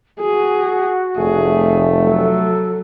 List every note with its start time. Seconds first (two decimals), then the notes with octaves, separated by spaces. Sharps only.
0.20 F#4 G#4
1.17 F1 A3 G#4
2.03 F#3 A4